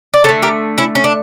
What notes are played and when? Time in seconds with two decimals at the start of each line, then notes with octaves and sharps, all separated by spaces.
0.14 D5
0.24 D3 A4 C#5
0.29 A3
0.42 G4 A#4
0.78 C#4 E4
0.95 C#4
1.04 D4